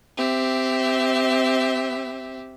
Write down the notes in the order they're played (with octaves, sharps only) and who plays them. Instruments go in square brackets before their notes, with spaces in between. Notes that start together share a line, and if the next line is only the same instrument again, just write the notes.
[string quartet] C4 G4 E5